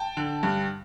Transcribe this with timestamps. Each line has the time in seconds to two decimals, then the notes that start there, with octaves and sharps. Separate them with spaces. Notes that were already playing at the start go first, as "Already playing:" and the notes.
Already playing: G5 A5
0.17 D3
0.43 G2